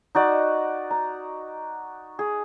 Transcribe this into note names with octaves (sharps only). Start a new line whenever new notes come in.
D#4 F#4 D5
A#5
G#4